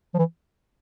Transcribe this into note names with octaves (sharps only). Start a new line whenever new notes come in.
F3
E3